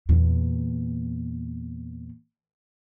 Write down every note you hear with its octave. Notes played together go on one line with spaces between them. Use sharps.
E2 A#2